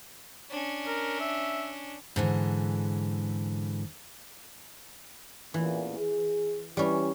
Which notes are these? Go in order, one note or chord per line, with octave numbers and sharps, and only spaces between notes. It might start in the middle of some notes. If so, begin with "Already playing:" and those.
C#4 D4
A#4
E5
G#2 D3 E3
A1 E2 A#2 E3
G#4
E3 G3 C#4